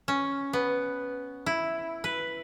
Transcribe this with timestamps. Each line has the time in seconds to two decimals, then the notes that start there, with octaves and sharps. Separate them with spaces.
0.08 C#4
0.53 B3
1.46 E4
2.04 B4